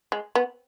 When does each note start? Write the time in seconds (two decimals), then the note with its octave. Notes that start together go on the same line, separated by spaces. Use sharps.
0.12 G#3
0.35 B3